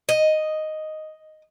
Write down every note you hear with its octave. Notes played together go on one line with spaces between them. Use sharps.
D#5